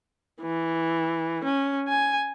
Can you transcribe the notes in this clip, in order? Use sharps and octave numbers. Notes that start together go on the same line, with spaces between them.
E3
C#4
G#5